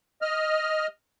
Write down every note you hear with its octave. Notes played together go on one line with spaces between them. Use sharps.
D#5 F6